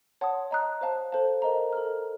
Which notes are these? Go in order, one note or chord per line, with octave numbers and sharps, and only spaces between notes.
C#5 F#5 A5 C6 D#6
D#5 A#5 D#6 F#6
C5 F5 A5
A4 C5 F5 A5
A#4 D#5 A#5
A4 D#5 A#5 F6